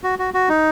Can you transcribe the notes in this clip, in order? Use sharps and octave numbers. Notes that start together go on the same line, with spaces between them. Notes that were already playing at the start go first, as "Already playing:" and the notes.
F#4
F#4
F#4
D#4